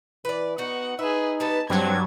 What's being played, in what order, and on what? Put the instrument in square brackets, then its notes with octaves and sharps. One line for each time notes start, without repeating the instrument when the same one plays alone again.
[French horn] E3 [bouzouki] B4 D5
[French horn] B3 [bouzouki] D#4 F#4 [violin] F#5
[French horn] D#4 [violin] G#4 B4 [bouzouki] E5
[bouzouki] G3 B3 B4 [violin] A5
[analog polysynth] G2 F#3 [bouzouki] D3 A3 [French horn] C4 [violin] G#6